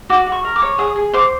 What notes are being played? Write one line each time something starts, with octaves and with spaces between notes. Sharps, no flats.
F#4 D6
F#4
C#6
A#4
D6
C#5
G#4 D#6
G#4
C5 D6